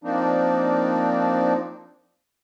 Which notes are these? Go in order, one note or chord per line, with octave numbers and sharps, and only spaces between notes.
F3 A#3 C4 D4 D#4